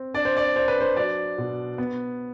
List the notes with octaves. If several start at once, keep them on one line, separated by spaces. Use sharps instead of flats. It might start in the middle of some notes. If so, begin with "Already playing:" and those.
Already playing: C4
D4 D5
C5
D5
D4 C5
B4
C5
F#3 D5
B2
B3